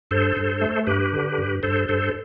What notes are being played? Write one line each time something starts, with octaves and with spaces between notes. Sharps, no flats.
G2 A4 C5
G2
A3
G2 G4 B4
D3
G2
G2 A4 C5
G2 A4 C5